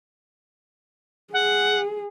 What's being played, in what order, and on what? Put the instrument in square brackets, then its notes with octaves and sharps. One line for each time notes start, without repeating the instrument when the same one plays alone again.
[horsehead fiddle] G#4 [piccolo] F#5